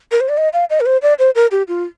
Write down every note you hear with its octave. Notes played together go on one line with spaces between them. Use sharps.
A#4
C5
D5
D#5
F5
D#5
A#4
C5
D5
C5
A#4
G4
F4